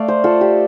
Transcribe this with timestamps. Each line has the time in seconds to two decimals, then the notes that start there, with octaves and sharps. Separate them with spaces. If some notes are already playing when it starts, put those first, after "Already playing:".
Already playing: A3 D5 F5
0.08 C5
0.24 F4 A4
0.41 G4